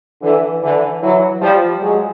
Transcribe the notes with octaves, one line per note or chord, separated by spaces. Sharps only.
D3 E3
D3 E3
E3 F#3
F3 G3
F#3 G#3